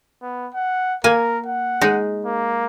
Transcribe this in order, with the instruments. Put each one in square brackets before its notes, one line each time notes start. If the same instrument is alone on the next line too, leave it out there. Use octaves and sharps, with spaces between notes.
[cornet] B3
F#5
[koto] A#3 G#5 [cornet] A#4
[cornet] F#5
[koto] G#3 D#4
[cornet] A#3